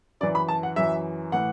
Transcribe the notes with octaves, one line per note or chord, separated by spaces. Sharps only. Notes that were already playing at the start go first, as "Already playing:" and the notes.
F#2 E3 D5
B5
A5
F#5
F#2 E3 E5
A2 E3 F#5